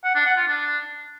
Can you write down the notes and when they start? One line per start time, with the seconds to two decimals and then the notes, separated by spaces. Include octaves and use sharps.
0.04 F#5
0.15 D4
0.26 F#5
0.36 F4
0.47 D4